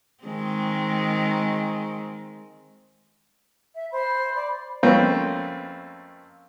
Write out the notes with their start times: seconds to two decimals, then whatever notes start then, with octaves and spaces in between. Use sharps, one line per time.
0.24 D#3 G#3 C4
3.75 E5
3.92 C5 B5
4.36 D5
4.83 F2 A3 A#3 C4 C#4 B4